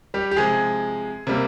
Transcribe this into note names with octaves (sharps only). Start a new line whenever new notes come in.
G3 G4
G4
C3 F3 G#3 G#4
C3 G3 A#3